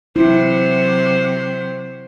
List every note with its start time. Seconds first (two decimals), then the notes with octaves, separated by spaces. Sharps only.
0.16 C3 F#3 E4 C5